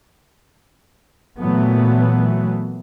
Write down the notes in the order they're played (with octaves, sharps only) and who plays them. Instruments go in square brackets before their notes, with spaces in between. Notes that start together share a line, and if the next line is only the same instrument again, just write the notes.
[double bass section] A#2 E3 F#3 A3 B3